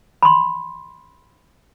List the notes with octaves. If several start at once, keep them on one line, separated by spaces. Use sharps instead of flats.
B5 C6